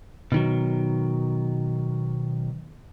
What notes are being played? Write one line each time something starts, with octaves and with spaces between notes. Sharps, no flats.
B2 D#3 F#3